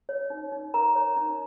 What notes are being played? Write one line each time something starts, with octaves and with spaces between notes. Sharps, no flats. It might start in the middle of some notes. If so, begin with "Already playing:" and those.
C#5
D#4
D#4
A#4 A#5
C#5
D#4